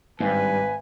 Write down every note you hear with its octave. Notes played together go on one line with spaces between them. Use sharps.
G#1 G2 B4 G#5